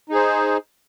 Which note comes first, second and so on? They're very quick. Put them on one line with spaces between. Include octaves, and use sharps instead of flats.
D#4 G#4 C5